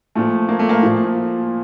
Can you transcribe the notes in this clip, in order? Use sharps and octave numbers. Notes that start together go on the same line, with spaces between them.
A#2 F3 A3
A#3
A3
A#3
A#2 F3